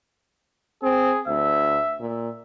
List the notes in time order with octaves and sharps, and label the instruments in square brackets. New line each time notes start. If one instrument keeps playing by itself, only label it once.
[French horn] C4 [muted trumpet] G#4
[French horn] D2 [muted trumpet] E5
[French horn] A#2